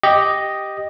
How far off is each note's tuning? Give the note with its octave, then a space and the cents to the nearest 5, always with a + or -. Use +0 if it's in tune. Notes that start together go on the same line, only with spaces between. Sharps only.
G4 +0 D#5 +0